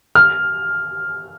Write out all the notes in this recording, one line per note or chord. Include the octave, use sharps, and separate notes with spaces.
F6